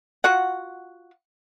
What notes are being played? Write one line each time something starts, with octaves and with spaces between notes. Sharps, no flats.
F4 F#4 F#5